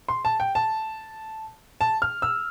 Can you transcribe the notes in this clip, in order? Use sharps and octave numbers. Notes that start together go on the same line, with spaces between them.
C6
A5
G5
A5
A5
F6
E6